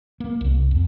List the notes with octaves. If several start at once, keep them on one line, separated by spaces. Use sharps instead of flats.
A#3
C2
F2